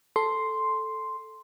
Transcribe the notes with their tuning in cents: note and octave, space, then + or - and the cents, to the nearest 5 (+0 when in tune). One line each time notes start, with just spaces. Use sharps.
A4 +0 C6 +0